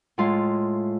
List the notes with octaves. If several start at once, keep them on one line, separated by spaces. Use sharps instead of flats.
A2 G#3 F4